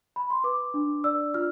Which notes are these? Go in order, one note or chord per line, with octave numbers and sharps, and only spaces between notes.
B5
C6
B4 D6
D4
D5 E6
F4 F6